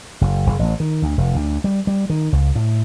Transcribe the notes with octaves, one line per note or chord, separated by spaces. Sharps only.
F#1
F#1
A1
D#3
D2
F1
D2
G3
G3
D#3
C#2
A2